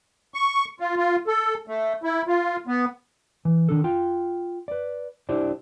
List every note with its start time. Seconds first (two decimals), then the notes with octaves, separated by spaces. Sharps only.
0.34 C#6
0.80 F4
0.96 F4
1.27 A4
1.67 A3
2.03 E4
2.27 F4
2.67 B3
3.45 E3
3.69 D#3 D4 A4
3.84 F4 G5
4.68 B4 D5
5.29 D4 E4 G4 C5 D5